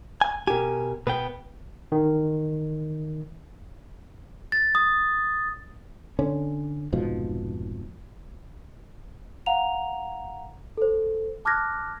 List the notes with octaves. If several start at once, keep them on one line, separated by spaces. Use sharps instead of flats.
G#5
B2 G4 A#4 G#5
B2 B3 B4 G5
D#3
A6
D#6
D3 C#4
F1 G#2 B2 F3
F5 F#5 A#5 F7
A4 C5
A5 D6 F6 F#6 G#6 A#6